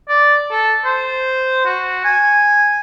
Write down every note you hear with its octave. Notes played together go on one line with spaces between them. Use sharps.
D5
A4
C5
F#4
G#5